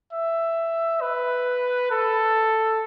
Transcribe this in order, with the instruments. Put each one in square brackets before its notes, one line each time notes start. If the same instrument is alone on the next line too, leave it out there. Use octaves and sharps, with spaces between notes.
[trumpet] E5
B4
A4